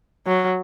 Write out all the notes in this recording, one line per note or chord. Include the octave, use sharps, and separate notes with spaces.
F#3